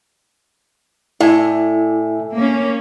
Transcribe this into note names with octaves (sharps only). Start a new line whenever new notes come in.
A2 E4 D5 E5 G#5
A#3 C#4